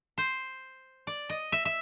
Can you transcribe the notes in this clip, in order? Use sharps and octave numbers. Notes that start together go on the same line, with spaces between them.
C5
D5
D#5
E5
E5